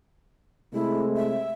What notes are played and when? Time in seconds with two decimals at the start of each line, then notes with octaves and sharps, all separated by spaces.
0.73 C3 G#3 A3 E4
1.16 E5